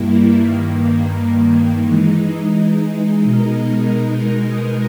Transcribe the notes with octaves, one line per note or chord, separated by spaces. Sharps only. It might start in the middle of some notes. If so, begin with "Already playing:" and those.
Already playing: G2 G3 A#3 E4
G2 D#3 A#3
E3 G#3 D#4
B2 G#3 D#4 A#4